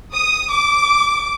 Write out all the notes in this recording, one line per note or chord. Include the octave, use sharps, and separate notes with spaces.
D#6
D6